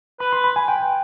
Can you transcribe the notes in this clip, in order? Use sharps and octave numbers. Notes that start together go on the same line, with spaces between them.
B4 B5
C6
B5
G#5
G5